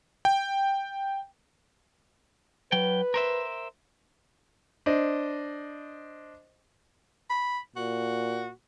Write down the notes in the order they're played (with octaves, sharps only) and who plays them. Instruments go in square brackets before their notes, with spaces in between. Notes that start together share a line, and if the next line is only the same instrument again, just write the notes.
[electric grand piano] G5
[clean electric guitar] F#3 G5 [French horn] B4
[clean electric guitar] A#4 C5 E5
[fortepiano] D4 C5 D#5
[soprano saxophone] B5
[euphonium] A#2 [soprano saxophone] F#4